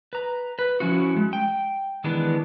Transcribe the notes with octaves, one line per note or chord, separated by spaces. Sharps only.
B4 A#5
B4
F3 C#4 E4 F#4
G#3
G5
D#3 E3 G#3 B3 D4 E4